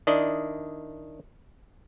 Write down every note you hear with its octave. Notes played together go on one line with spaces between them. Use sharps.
D#3 D4 E4 D5 D#5